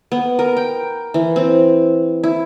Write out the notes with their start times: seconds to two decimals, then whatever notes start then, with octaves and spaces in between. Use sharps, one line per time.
0.12 B3
0.39 A#4
0.57 G5
1.14 E3
1.36 C4
2.24 E4